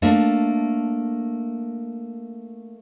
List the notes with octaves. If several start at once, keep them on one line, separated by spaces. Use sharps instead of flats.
A3 A#3 D4 E5